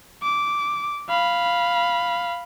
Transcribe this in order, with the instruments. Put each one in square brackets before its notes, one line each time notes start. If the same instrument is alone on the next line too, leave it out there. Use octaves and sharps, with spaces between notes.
[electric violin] D6
F5 B5